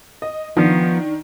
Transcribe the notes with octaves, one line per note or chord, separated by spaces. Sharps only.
D#5
D#3 F3 B3 D4